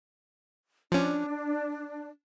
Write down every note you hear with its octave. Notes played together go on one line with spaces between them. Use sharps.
F3 C#4 D4